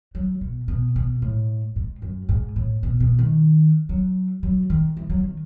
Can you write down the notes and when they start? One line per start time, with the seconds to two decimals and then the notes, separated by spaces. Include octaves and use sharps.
0.15 F#3
0.41 B2
0.68 B2
0.96 B2
1.22 A2
1.76 G#2
2.02 F#2
2.29 G#2
2.56 A2
2.83 B2
3.00 B2
3.19 D#3
3.89 F#3
4.43 F#3
4.70 D#3
4.97 E3
5.10 F#3
5.23 D#3